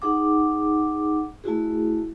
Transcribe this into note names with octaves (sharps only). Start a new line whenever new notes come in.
D#4 G#4 F#5 D6
A3 E4 F#4 G#4